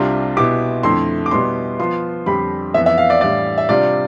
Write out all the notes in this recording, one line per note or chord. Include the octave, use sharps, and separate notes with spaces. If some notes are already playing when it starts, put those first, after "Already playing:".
Already playing: C2 C3 G3 D4 F4 C6
B2 B3 E4 G4 D6
F2 D3 A3 E4 C6
D6
B2 G3 B3 E4 C6
F3 B3 F4 C6
F2 D3 G3 D4 G4 B5
F2 E3 B3 E5
E5
F5
D5
A2 E3 G3 D4 D5
E5
C3 G3 D4 F4 D5